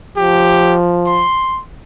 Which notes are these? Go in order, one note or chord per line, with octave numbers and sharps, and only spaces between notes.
F3 G4
C6